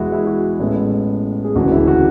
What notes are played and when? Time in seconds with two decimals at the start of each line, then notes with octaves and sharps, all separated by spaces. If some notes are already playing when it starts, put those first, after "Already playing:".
Already playing: E2 B2 G#3 E4 F#4 G#4
0.12 E4 G#4
0.27 F#4
0.59 A1 A2 G#3 B3
1.44 G#4
1.55 E1 D2 C#3 E3 F#4
1.72 E4
1.87 F#4